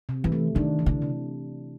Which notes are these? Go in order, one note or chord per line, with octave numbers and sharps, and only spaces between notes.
C3
E3
A3
D#3 D4
E3
D3
C3